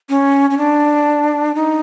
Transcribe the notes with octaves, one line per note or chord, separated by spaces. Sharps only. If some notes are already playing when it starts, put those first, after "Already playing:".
C#4
C#4
D4
D#4